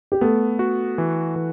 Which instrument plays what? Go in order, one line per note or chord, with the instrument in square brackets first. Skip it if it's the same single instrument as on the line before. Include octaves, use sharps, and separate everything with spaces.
[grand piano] G4
[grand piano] A3 A4 [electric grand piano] B3
[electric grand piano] F#4
E3
E3